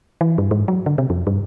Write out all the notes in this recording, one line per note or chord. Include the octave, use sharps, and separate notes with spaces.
E3
G2
G#2
F#3
D3
C3
F2
G2